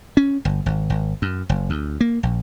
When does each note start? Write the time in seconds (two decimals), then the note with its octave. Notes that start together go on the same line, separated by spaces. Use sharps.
0.17 C#4
0.45 G1
0.66 G#1
0.90 G#1
1.22 F#2
1.49 F#1
1.70 D2
2.01 A#3
2.23 A#1